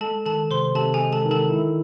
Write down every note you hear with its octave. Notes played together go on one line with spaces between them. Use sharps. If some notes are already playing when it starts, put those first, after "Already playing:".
G#3 A4 A5
D#3 A4 A5
C3 C5 C6
C3 A4 A5
G#4 G#5
G#3
A4 A5
D#3
A4 A5
E4